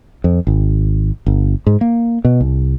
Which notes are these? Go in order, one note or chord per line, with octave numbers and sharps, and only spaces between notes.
F2
G#1
G1
G#2
A#3
B2
C2